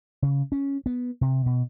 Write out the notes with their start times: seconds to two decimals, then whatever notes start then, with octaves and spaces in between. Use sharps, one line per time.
0.22 C#3
0.52 C#4
0.86 B3
1.21 C3
1.46 B2